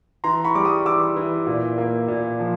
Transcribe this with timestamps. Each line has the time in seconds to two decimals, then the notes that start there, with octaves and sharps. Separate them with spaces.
0.24 E3 A#5 C6
0.44 B5 C#6
0.55 G3 D6
0.65 C#6 D#6
0.86 E3 D6 E6
1.16 E3
1.47 A#2
1.78 A#3
2.08 A#2
2.40 F3